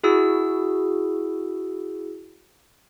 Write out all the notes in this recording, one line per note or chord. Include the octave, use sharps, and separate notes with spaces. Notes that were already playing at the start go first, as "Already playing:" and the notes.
E4 F#4 G#4 E6